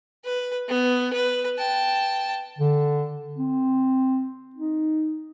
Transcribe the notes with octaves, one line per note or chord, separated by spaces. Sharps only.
B4
B3
B4
G5 A5
D3
C4
D#4